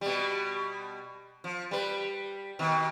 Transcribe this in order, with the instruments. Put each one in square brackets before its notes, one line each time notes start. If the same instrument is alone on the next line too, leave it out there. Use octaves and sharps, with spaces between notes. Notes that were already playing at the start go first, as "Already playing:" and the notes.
[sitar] B2 G3
F3
G3 B4
B2 D#3